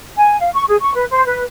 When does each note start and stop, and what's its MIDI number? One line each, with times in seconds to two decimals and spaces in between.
0.17 0.38 80
0.40 0.50 77
0.55 0.63 85
0.68 0.76 68
0.81 0.92 85
0.94 1.05 71
1.10 1.24 72
1.26 1.44 71